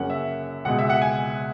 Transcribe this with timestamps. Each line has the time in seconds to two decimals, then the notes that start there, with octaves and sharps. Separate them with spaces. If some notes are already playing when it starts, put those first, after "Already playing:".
Already playing: F#2 C#3 F#3 A#3 C#4 F#5
0.10 E5
0.65 C#2 B2 G#3 F#5
0.79 E5
0.90 F#5
1.02 G#5